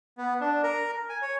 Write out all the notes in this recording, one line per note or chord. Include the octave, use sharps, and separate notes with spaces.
B3
D4
A#4
G#5
C#5